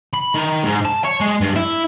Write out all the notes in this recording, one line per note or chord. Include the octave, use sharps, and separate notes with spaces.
B5
D#3
G#2
A5
C#5
G#3
G2
E4